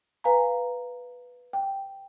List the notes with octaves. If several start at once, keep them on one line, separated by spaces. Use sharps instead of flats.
B4 F5 G#5 A#5
G5